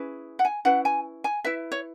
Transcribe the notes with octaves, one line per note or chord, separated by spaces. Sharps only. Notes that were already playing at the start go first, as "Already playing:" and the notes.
Already playing: C#4 E4 G#4 B4
F#5
G#5
C#4 E4 B4 F#5
G#5
G#5
E4 B4 E5
C#5